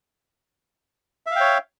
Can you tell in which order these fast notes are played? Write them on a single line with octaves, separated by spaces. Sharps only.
E5 F5 G5 C#5